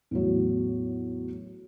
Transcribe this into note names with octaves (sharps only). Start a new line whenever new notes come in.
E2 A2 F#3